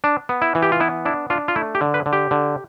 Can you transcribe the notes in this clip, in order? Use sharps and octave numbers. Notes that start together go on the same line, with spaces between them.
D4
B3
E4
E3
G4
F4
B3 E4
D4 E4
D4 F4
F4
A3 E4
G4
D3
B4
D3
G4
D3